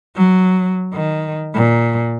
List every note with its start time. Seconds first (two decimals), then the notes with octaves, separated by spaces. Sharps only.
0.16 F#3
0.93 D#3
1.55 A#2